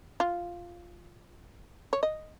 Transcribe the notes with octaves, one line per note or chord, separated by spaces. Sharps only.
F4
C#5
D#5